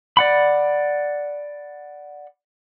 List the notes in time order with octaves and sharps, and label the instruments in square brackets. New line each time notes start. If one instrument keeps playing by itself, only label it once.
[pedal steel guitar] D5 F#5 B5